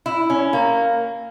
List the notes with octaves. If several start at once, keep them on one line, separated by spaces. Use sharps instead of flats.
E4
C#4
A#3